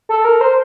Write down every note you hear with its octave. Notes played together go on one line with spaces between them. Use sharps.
A4
A#4
C5